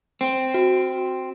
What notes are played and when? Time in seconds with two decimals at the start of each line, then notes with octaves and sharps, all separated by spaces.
0.21 C4
0.54 F#4